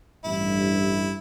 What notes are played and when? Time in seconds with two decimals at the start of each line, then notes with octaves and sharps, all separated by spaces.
0.25 A1 G2 E4